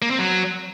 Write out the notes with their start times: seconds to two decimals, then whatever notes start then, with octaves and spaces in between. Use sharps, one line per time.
0.02 A#3
0.10 C4
0.19 F#3